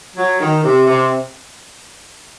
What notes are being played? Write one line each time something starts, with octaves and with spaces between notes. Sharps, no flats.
F#3
D#3
C3
C3